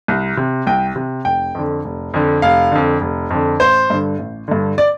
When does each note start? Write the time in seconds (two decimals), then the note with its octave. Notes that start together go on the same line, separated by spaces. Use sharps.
0.08 C2
0.37 C3
0.67 C2 G5
0.96 C3
1.25 F1 G5
1.55 F2 D3
1.85 F1
2.14 F2 D3
2.42 F1 F5
2.72 F2 D3
3.01 F1
3.30 F2 D3
3.60 A1 C5
3.90 G2 D3
4.19 A1
4.48 G2 D3
4.78 D5